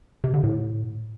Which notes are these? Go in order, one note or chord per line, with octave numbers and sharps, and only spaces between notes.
C3
D3
A2